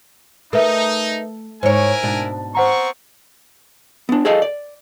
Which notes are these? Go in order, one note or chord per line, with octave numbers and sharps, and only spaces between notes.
A3 D#4 A#4 B4 E5
G#2 E4 A#4 C5 C#5 G#5
G#2 B2 D4
B3 C4 C5 F#5 A#5 C#6
B3 D4
G#4 A4 D#5 F5
D5